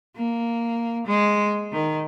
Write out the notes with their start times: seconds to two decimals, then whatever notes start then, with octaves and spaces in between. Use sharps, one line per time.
0.16 A#3
1.07 G#3
1.72 D#3